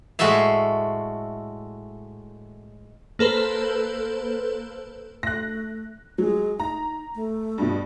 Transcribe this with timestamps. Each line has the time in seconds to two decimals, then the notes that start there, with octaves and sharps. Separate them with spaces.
0.19 A2 G#3 F#4 A4 E5 F5
3.19 A#3 A4 B4 C5
5.23 A3 F#6 A#6
6.18 F#3 G#3
6.60 D#4 A#5
7.15 A3
7.58 G2 B2